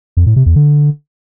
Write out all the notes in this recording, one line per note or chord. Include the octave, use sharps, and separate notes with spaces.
F2
A2
C3
E2
D3